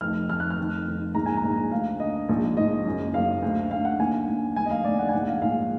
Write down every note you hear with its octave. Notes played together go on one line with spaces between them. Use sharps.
F1 F2 D#3 F6
F1 F2 D#3 F6
F#6
F6
F1 F2 D#3
F1 F2 D#3
A#1 G#2 D#3 A#5
G#5
A#5
A#1 G#2 D#3
D2 D3 F5
D2 D3 D#5
A#1 G#2 D#3
A#1 G#2 D#3 D#5
F#1 F#2 D#3
F#1 F#2 D#3 F5
D2 D3
D2 D3 F5
F#5
D#2 D3 G#5
D#2 D3
F1 D#2 D3 G#5
D#5
F5
F1 D#2 D3 D5
F#5
G#5
A#1 G#2 D#3 F#5
F5
A#1 G#2 D#3 F5